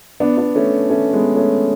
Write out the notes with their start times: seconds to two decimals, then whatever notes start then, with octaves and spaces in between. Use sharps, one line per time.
0.20 B3 D4
0.37 B3 D4
0.55 A3 C#4
0.90 A3 C#4
1.13 G#3 B3
1.36 A3 C#4